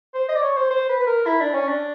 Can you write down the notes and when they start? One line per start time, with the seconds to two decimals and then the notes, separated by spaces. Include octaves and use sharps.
0.14 C5
0.29 D#5
0.36 D5
0.42 C#5
0.56 C5
0.70 C5
0.89 B4
1.00 B4
1.07 A#4
1.26 E4
1.40 D4
1.54 C#4
1.68 D4